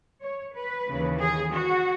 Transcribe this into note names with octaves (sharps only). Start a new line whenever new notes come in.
C#5
B4
D#2 C#3 E3
G#4
F#4